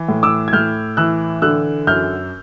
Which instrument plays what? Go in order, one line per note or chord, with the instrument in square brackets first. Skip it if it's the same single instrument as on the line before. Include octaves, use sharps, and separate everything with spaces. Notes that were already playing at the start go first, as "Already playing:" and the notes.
Already playing: [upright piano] E3
A2
D6 E6
G#6
A2 F6 G6
E3 E6 F#6
D3 E6 F#6
F#2 F6 G6